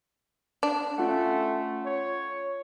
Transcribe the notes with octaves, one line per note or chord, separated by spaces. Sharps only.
D4
A3 C#4 F4 F#5
C#5